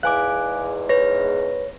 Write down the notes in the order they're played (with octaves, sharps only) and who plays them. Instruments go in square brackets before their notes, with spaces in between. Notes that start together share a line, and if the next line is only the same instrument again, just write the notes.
[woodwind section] E2 G#2 [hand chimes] F5 G#5 D6 [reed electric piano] F#6
[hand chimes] B4 A#6 [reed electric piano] C#5